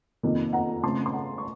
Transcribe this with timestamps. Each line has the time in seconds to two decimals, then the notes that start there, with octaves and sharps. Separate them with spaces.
0.23 F2 C3 D#3 A#3
0.53 F#5 A#5
0.83 C#3 A3 C4 A5 C6
1.06 C6
1.13 F#5 A#5
1.38 C#6